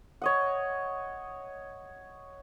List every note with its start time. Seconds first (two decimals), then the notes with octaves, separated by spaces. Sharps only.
0.22 C#5 D#5 F#5